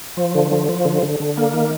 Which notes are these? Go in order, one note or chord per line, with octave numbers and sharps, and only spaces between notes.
F3
D3
F3
F3
D3
D3
D3
A#3
D#3